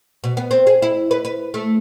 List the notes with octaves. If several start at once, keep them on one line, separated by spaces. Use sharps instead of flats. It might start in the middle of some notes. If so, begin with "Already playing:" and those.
B2
B3
C4
G#4
E4
B4
B4
A3